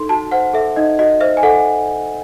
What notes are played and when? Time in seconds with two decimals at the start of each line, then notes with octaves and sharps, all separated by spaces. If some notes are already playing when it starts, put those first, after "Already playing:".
Already playing: D#4 A4 C6
0.09 F#4 A5
0.32 C5 F#5
0.53 A4 E5
0.76 D#4 D#5
0.99 F#4 D#5
1.21 C5 E5
1.37 G#5
1.43 A4 F#5